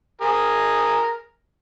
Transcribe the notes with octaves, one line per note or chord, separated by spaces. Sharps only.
G#4 A#4